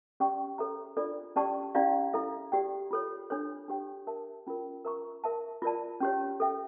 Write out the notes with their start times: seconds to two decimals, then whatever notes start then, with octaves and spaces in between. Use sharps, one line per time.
0.20 C#4 G4 D5 G5 C#6
0.58 A4 C#5 E5 A#5
0.97 D4 F4 A4 D5
1.36 C#4 G4 D5 A5 C#6
1.75 C#4 E4 G4 D5 F5
2.13 E4 A4 E5
2.52 G4 D5 G5
2.91 F4 A4 C#5
3.30 D4 A4 C#5
3.68 D4 G4 C#5 G5
4.07 A#4 E5 A5
4.47 C#4 F4 A#4
4.85 A#4 E5 A#5 C#6
5.24 A#4 E5 A5
5.62 F4 A#4 D5 A5
6.00 C#4 G4 C#5
6.40 A4 E5 G5